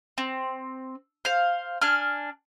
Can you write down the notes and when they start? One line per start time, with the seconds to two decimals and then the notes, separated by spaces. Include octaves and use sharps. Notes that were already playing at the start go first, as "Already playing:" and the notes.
0.18 C4
1.25 C5 F5
1.81 D4 G#5 F6